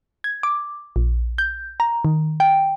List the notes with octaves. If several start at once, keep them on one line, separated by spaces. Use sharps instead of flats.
G#6
D6
A#1
G6
A#5
D#3
G5